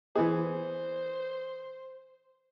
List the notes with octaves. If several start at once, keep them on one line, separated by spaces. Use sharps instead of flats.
E3 B3 G#4 C5